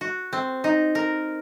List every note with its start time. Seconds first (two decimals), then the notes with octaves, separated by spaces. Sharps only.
0.01 F#4
0.33 C4
0.64 D#4
0.95 A#4